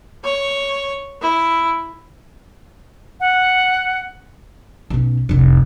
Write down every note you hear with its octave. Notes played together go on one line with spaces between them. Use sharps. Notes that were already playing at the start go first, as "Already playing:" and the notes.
C#5
E4
F#5
B1 C#4
F1 C2